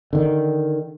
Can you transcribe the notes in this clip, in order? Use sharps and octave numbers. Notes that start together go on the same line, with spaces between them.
D3 D#3